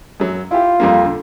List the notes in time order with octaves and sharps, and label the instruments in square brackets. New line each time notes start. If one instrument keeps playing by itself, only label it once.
[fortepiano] F#2 F#3
[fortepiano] E4 G4 [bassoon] F4
[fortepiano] F2 G3 A#3
D3